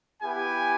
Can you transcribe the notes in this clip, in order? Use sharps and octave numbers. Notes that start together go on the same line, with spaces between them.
B3 E4 G4 G#5